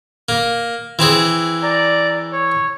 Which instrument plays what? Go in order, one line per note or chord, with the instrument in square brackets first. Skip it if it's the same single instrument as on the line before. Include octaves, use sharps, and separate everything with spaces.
[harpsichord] A#3
E3 C4 G#4
[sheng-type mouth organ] D5 A#5
C#5